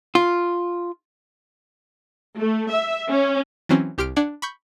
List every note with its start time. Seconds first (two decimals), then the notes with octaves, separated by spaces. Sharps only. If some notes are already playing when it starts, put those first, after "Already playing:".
0.15 F4
2.37 A3
2.70 E5
3.10 C#4
3.69 E3 F#3 C4 C#4
3.98 C2 G4 C6 F6 D7
4.16 D4 D5 F#5 G#6
4.42 B5 C#6 G6